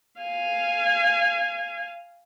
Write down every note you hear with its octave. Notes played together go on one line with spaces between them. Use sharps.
F5 G#5